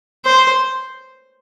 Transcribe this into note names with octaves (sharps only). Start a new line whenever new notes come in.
C5